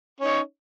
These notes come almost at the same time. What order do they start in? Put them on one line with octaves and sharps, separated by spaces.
C#4 D#4 C#5